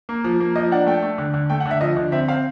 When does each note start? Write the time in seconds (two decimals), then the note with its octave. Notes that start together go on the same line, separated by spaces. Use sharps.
0.09 A#3
0.24 F3
0.40 A#3
0.56 F3 D#5
0.72 D4 F#5
0.87 A3 G5
1.02 A3
1.18 D3
1.34 D3
1.50 A3 G5
1.60 F#5
1.66 D3
1.71 E5
1.81 F3 D#5
1.97 D3
2.12 C4 E5
2.28 C4 F5